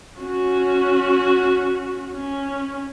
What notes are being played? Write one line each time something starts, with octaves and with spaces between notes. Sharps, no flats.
C#4 F#4
C#4